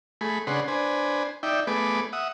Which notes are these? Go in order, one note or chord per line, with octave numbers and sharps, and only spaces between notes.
A3 G#4 B5
C#3 D4 G#4 B4 F#5 C6
D4 B4 C5 G#5
D#4 D5 E5 G5
A3 B3 G#4 B4 D6
E5 F#5 D#6